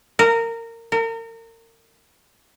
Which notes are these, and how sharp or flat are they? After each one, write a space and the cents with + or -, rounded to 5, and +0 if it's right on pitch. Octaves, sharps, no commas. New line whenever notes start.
A#4 -20
A#4 -35